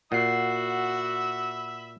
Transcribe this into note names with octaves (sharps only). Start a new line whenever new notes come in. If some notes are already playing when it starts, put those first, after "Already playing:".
A#2 F#4 E5 F#5 B5 E6 C7